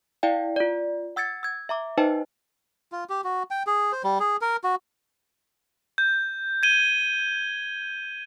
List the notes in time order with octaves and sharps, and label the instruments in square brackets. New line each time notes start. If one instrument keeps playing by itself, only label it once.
[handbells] E4 D5 F5 G5
F4 D5
F#5 E6 G#6 A6 C#7
E6 G#6
E5 A#5 D6
D#4 B4 C5 D#5 G5 A5
[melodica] F4
G4
F#4
G5
G#4
C5
G3
G#4
A#4
F#4
[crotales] G6
G#6 D#7 G7